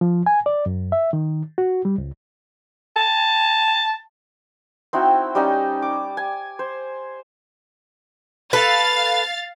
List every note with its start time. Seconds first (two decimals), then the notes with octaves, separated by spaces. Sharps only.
0.01 F3
0.26 G#5
0.46 D5
0.66 F#2
0.92 E5
1.13 D#3
1.58 F#4
1.85 G3
1.98 C#2
2.96 A5
4.93 C4 D#4 E4 F#4
5.35 G3 C#4 D#4
5.82 D6
6.17 G#5
6.59 C5
8.53 A4 B4 F5 A6